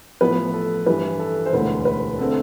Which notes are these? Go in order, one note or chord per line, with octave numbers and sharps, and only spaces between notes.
A1 A2 F3 B3 B4
A4
G2 E3 G3 B4
A4
C5
E1 D2 D3 B4
B4
D3 A3 C4 A4